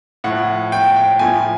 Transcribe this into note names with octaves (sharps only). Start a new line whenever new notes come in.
A2 F3 F#5
G5
G5
A2 F3 G#5